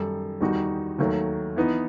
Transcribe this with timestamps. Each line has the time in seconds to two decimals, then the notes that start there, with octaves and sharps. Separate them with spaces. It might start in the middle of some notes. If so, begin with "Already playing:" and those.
Already playing: F#2 D#3 G3 D#4 A4
0.41 E2 D#3 G3 D#4 F#4
0.98 D#2 D#3 F#3 A3
1.56 E3 B3 D#4